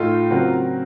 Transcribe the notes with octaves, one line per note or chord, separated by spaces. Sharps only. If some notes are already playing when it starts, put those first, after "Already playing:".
Already playing: A2 A3 D#4 F4 A4
C#3 F#3 C4 F#4 A#4